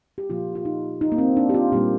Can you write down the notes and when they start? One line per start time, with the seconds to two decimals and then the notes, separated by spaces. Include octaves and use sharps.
0.18 G4
0.30 A#2 F3 A#3 F4
0.55 F4
0.65 D#4
1.01 D#4
1.12 A#3
1.18 C4
1.37 D4
1.49 G4
1.54 F4
1.72 A#2 G3 A#3 G4